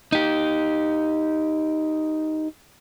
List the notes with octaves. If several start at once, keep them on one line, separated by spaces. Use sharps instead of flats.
D#4 G4